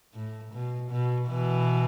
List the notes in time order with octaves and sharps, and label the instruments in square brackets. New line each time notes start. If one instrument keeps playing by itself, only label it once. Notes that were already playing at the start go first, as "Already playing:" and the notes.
[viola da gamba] A2
B2
B2
B2 E3